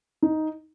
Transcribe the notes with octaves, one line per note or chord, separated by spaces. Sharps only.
D#4